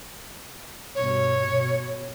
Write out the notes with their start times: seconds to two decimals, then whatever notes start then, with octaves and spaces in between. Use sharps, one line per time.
0.95 G2 B2 C#5
1.48 B2